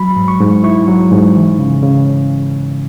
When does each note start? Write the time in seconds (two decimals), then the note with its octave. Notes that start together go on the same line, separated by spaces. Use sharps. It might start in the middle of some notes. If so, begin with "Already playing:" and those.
Already playing: F#3 B5
0.16 G#2
0.28 C#6
0.40 G#2
0.64 E4 C#6
0.88 F#3
1.12 G#2
1.36 E3
1.59 C#3
1.83 C#3